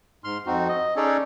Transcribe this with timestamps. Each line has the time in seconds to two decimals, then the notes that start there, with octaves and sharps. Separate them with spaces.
0.24 G#2 C6 F6
0.46 F2 C4 D#4 F#4
0.68 D#5
0.96 C#4 D#4 G#4 A4 C#5 D5